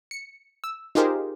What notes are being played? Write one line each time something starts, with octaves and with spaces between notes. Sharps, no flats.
C#7
E6
D#4 F4 G4 G#4 A#4 C5